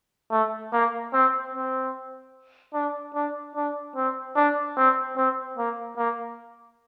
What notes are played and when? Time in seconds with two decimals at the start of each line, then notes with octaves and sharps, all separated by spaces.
0.31 A3
0.73 A#3
1.13 C4
1.54 C4
2.74 D4
3.14 D4
3.56 D4
3.96 C4
4.36 D4
4.77 C4
5.17 C4
5.57 A#3
5.97 A#3